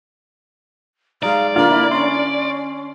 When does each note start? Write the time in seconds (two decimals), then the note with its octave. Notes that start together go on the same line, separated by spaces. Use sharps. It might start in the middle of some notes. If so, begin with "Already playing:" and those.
1.23 G#3 D#4 D5 F5
1.56 D3 A#3 D4 F4 E5
1.71 E4
1.92 C#4 C6